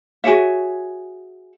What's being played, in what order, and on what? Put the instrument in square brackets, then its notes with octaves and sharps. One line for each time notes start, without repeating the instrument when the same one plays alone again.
[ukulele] F#4 G#4 C#5 E5